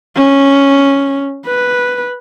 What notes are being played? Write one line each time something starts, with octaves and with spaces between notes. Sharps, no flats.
C#4
B4